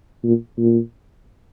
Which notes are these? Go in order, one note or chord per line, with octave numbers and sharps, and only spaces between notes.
A#2
A#2